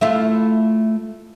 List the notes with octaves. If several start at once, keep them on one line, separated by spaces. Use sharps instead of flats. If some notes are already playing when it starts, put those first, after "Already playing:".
A3 E4 F4